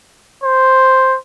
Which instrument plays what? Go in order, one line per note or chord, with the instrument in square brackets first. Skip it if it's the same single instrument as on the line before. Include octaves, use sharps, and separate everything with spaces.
[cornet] C5